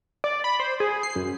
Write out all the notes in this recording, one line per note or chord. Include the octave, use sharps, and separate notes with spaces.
D5
B5
C5
G#4
C7
F#2